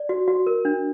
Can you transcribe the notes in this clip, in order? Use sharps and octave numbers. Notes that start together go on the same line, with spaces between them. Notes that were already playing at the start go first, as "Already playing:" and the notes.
Already playing: D5
F#4
F#4
A#4
D4